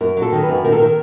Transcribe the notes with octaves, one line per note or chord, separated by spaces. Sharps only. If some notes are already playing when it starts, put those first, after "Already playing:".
F#2 A#4
F#3
A4
D#3
B4
F#2
D#3 A#4
A4
D#3 A#4